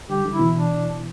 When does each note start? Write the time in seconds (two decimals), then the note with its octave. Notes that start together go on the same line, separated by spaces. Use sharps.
0.09 D3 G3 G4
0.25 D3 G3
0.32 E4
0.39 B2 E3
0.55 D4